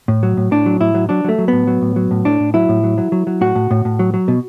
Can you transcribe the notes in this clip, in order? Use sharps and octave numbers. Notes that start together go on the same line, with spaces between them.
A2
F#3
A2
A2 D4
F#3
A2 E4
F#3
F#3 D4
F#3 A3
F#3
A2 B3
F#3
A2
F#3
A2
A2 D4
A2
F#3 E4
A2
F#3
F#3
F#3
F#3
A2 F#4
A2
A2
A2
F#3
F#3
B2